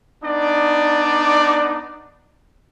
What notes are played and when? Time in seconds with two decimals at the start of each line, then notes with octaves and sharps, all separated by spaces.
0.23 B3 D4 D#4 D5